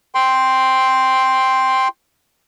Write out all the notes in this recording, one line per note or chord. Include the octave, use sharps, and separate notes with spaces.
G5 C6